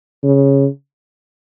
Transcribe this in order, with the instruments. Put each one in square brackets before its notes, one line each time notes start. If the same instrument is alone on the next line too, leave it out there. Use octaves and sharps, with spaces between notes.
[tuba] C#3